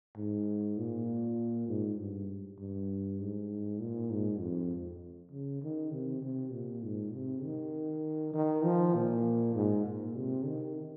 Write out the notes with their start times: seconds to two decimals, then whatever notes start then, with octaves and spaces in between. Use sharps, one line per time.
0.16 G#2
0.78 A#2
1.68 G#2
1.98 G2
2.59 G2
3.20 G#2
3.80 A#2
4.11 G#2
4.40 F2
5.31 C#3
5.62 D#3
5.92 C3
6.23 C3
6.52 A#2
6.83 G#2
7.14 C3
7.44 D#3
8.34 D#3
8.64 F3
8.95 A#2
9.55 G#2
9.85 A#2
10.15 C3
10.47 D#3